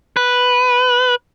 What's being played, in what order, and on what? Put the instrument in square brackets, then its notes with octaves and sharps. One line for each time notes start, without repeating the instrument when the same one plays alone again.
[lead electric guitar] B4